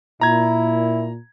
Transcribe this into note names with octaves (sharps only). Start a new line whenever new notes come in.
A#2 E4 A#5 G#6